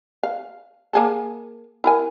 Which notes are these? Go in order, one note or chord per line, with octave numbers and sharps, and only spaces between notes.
F5
A#3 G#4 A4
E4 A#4 G#5